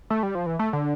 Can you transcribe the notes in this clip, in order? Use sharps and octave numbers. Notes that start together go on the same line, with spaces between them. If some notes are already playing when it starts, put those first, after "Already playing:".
A3
G3
F3
E3
A3
D3